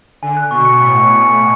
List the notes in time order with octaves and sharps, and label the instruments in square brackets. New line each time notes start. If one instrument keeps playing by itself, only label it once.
[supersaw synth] D3 [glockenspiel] G#5
[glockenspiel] F#6
[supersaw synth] B2 [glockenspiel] C#6
[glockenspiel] C#7
[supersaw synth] A2 [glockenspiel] C#7
[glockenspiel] C#6
C#7
G#5
C#7